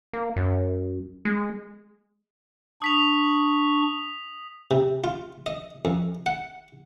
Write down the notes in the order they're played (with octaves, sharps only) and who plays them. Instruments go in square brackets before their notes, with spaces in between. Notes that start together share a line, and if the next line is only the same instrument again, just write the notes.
[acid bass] A#3
F#2
G#3
[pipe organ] D4 C#6 [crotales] D#6 B6 F7
[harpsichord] C3
F4
D#5
F2
F#5